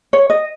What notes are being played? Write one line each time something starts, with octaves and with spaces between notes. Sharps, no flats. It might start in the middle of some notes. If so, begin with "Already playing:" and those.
C#5
D#5